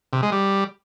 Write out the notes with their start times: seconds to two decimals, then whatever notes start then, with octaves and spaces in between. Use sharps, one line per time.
0.13 C3
0.22 G#3
0.32 G3